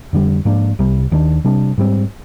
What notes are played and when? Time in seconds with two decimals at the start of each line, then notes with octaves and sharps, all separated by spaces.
0.13 F2 D3 G3
0.45 G#2 F3 A#3 D4
0.79 C2 C3 G3
1.11 D#2 D#3 G3 D4
1.44 C3 G3 D4
1.78 G#2 G3 C4